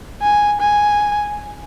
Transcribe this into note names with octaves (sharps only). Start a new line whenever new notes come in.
G#5
G#5